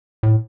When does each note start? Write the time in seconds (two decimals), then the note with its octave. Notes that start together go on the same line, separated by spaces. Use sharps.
0.23 A2